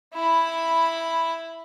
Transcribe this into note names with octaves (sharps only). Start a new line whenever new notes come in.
E4 B5